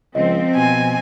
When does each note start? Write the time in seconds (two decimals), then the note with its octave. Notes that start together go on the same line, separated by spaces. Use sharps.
0.15 C#2 F3 C4 D#5
0.55 B2 G#5